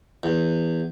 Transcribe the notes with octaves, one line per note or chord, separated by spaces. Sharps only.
E2